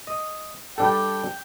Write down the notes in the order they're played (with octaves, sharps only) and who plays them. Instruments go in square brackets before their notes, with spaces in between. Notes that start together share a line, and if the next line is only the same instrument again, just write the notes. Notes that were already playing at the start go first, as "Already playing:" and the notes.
[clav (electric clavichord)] D#5
[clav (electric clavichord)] G3 D4 A4 [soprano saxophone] G5